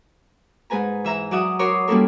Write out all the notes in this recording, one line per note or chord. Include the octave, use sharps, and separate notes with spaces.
G#2 G#3 B4 G#5 A#5
E3 E5 A#5 E6
F#3 D5 E5 F#5 D#6
F#4 A#4 C#5 C6 D6 D#6
G3 A#3 C#4 E4 A4 A#4